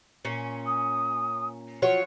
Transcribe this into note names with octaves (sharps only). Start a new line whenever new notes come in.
A#2 C#4
D#6
F3 F#3 C#5 F#5